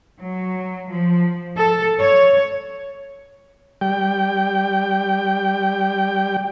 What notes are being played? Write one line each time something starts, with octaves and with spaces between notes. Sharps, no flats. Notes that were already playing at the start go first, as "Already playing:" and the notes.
F#3
F3
A4
C#5
G3 G5